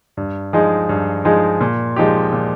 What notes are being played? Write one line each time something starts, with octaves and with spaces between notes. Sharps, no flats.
G2
F3 G#3 D#4 G#4
G2
F3 G#3 D#4 G#4
A#2
F3 G#3 D#4 G4
A#2